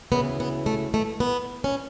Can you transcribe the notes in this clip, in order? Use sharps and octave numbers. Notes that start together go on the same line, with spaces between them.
D2 C#3 E3 B3
B3
A3
A3
B3
C#4